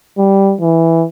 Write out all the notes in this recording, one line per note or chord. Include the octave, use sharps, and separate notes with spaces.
G3
E3